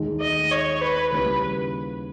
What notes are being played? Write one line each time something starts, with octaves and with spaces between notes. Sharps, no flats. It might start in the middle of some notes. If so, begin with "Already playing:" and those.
Already playing: D#2 D#3 G#3 D#4
D#5
C#5
B4
D#2 C#3 G3 A#3 E4 B4